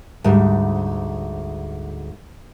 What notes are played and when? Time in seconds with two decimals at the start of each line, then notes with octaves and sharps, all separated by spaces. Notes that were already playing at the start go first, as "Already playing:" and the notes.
0.24 D2 G#2 G3